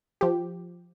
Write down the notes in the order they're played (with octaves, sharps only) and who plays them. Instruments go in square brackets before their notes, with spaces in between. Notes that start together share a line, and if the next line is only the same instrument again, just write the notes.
[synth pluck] F3 G4